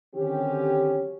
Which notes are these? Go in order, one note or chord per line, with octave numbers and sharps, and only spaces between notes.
D3 D#3 F#3 C4 C#4 G4